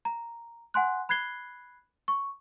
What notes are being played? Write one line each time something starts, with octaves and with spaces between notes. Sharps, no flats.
A#5
F#5 G#5 C6 F#6
B5 F#6 G#6 C7 G7
C#6